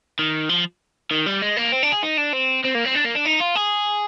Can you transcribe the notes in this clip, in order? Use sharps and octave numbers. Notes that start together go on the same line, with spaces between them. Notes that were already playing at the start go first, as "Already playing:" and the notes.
D#3
F3
D#3
G3
G#3
A#3
C4
D4
G#4
D#4
D4
C4
C4
A#3
C4
D4
A#3
D4
D#4
F4
G#4